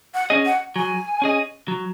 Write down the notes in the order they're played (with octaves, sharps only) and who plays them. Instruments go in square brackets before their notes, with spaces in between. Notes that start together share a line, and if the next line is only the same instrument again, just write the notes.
[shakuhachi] F#5
[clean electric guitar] C#4 G#4 D#5
[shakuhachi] F#5
[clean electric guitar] F#3 [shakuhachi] G#5
[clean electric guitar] C#4 G#4 D#5
F#3